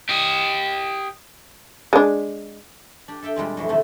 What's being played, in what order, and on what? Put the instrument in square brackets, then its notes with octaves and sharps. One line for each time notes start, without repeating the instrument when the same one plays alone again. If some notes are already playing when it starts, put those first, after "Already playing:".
[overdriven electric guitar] G4 D#5
[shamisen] G#3 D4
[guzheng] D4 G4
A4 E5 F5 G5
A#2 G3 G#3 C4
F2 E3 F#3
C3 D#3 A3